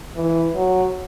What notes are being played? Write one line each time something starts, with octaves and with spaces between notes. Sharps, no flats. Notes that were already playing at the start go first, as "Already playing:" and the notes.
E3
F#3